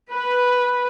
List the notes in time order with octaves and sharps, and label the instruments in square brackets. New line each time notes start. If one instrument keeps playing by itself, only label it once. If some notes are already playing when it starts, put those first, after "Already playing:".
[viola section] B4